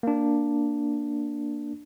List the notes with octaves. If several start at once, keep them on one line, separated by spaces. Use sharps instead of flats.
A#3 D4